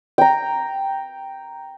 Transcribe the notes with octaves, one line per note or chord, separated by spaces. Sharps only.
G5 A#5